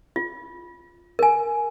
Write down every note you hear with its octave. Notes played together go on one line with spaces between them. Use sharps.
F4
A#4 G#5